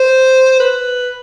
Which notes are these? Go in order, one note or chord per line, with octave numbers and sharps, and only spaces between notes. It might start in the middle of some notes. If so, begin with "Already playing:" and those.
Already playing: C5
B4